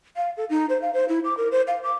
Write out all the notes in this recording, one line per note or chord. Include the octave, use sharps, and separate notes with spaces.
F5
A4
D#4
C5
F5
C5
E4
D6
A#4
C5
F5
D6